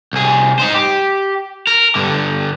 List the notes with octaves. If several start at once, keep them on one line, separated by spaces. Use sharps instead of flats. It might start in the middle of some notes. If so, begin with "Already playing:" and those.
C2 G#4
D#4 C5
G4
A#4
G2 D3